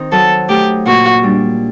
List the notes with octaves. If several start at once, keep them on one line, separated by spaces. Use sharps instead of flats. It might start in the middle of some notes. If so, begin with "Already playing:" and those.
Already playing: D#3 C4 D#4
F#3 A4
A3 D#4 G4
A#2 F#4
G3 D4